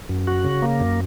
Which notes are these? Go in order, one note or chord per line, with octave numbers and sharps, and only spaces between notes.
F#2
F#4
C#3
A#3
F#2